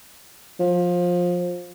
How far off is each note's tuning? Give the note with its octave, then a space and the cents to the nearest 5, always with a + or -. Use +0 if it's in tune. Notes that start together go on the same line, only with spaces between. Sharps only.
F3 +20